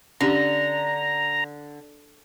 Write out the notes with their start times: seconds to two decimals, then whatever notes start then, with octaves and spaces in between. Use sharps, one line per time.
0.21 D3 C#4 D4 G4 A#5